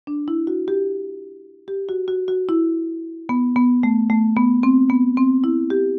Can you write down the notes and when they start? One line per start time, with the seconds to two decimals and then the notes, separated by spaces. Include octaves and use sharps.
0.07 D4
0.28 E4
0.47 F#4
0.68 G4
1.68 G4
1.89 F#4
2.08 F#4
2.28 F#4
2.49 E4
3.29 B3
3.56 B3
3.83 A3
4.10 A3
4.36 B3
4.63 C4
4.90 B3
5.17 C4
5.44 E4
5.70 G4